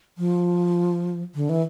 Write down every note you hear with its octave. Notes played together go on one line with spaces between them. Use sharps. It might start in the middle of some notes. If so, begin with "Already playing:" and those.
F3
D3
E3